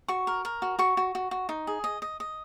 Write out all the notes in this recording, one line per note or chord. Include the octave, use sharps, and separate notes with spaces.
F#4 C#6
A#4
A#4
F#4
F#4 C#6
F#4
F#4
F#4
D#4
G#4
D#5
D#5
D#5